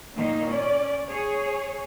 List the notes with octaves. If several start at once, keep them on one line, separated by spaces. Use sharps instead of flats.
A#2 D#3 A#3 D#4
C#4 D5
G#4 C#5